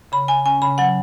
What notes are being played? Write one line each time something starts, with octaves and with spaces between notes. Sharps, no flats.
C#3 B5
C#3 G#5
C#4 G#5
C#3 B5
F#3 F#5